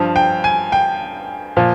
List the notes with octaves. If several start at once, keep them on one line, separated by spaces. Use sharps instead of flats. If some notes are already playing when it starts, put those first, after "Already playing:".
Already playing: G2 F3
G5
G#5
G5
A#2 F3